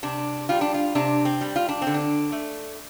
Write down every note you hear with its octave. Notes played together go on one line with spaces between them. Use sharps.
C3 D4
G3 F4
D4
F4
C3 D4
C4
G3
F4
D4
C4
D3
D4
A3